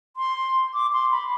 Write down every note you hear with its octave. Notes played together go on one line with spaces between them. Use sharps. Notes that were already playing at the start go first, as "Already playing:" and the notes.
C6
D6
C6
B5